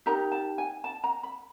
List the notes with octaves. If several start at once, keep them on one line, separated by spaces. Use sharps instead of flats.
D#4 G4 A#4 A#5
A5
G#5
A5
A#5
B5